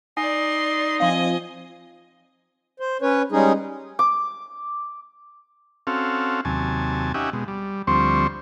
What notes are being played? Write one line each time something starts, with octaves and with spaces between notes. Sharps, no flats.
D#4 D5 G#5 C6
F3 C4 D#5 F5 G#5 C6
C5
C#4 B4 C#5
G3 G#3 C#4 D#4 G#4
D6
C4 C#4 F#4 A4 F5
D#2 C3 F#3 G#5 A5
C#4 D#4 G4 E5 F#5 G#5
B2 G#3
G3
D2 F3 G3 C4 C5 C#6